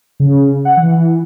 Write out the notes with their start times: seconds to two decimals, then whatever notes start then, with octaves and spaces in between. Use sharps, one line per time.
0.20 C#3
0.65 F#5
0.77 E3